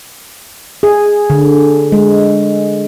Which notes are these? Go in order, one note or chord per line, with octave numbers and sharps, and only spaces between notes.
G#4
D3
G#3